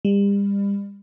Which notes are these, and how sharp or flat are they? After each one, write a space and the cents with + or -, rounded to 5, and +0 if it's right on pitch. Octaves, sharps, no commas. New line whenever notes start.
G3 +35